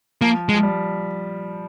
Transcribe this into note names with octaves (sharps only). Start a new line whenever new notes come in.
F3 A#3
G#3
F3
G3